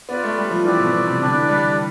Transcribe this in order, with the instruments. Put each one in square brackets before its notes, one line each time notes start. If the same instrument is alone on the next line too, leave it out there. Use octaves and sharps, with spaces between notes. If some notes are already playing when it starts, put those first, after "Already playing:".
[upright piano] B3 [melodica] F4 B4 D5
[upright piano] A3
G3
F3
[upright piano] E3 [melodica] C4 G4 B4 D5
[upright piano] B2
B2
C3
[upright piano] D3 [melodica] D4 G4 B4 D5
[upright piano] E3
G3